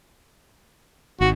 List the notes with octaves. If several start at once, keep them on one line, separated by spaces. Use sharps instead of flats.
G#1 F#4